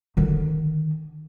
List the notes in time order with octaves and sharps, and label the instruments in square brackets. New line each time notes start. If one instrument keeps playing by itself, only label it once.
[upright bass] D3 D#3